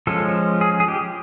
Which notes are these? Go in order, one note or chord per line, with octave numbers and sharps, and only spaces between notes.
F3 G#3 C#4 A4
G#4
G#4
G4